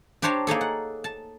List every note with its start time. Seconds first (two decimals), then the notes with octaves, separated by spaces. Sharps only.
0.22 D4 G4 C5 C#5 A5 A#5
0.47 A#3 D#4 G#4 A4
0.61 F#5
1.04 A5